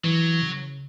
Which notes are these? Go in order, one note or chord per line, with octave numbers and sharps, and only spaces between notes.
E3 F#3
C#3